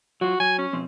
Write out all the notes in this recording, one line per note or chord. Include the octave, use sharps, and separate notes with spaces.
F#3 F4 F#4
F#3 F#4 G#5
C#4
B2 F3 C4